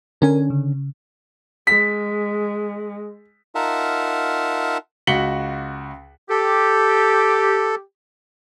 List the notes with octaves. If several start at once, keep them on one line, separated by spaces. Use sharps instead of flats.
D3 C#4 A#4 G#5
C#3
G#3 B6
D#4 F4 A#4 E5 F#5 A5
C#2 F#4 B6 C#7 F#7 G7
G4 A4